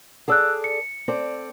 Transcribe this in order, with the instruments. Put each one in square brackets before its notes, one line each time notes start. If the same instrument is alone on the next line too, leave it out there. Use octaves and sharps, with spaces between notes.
[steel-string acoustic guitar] G#4 A4 D5 [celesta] F#5 E6 F#6
[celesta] C#7
[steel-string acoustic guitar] C4 A4 D5